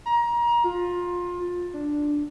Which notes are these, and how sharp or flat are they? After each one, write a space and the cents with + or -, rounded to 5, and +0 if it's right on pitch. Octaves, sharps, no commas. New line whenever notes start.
A#5 +25
F4 +20
D4 +5